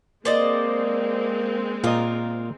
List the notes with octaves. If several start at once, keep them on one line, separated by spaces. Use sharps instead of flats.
G#3 A#3 C4 C5 D5 D#5
A#2 F4 A#4 D#5